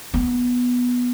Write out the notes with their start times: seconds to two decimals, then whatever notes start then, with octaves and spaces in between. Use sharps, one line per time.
0.14 B3